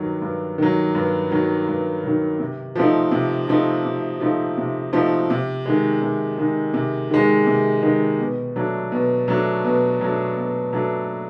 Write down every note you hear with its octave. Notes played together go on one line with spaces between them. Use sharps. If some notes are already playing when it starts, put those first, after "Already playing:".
Already playing: G2 D#3 F#3
G2
D#3 F#3
G2
D#3 F#3
G2
D#3 F#3
C3
F3 A3 C4 D#4
C3
F3 A3 C4 D#4
C3
F3 A3 C4 D#4
C3
F3 A3 C4 D#4
C3
D#3 G#3
C3
D#3 G#3
C3
D#3 G#3
C3
D#3 G#3
B2
F#3 A3 D4
B2
F#3 A3 D4
B2
F#3 A3 D4
B2
F#3 A3 D4